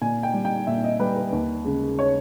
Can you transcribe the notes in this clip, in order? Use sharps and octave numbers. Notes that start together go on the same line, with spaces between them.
A#2 G#5
G5
G3
G5
A#2 E5
D#5
G3 B4
B4
D#2
C#3 G#3
C#5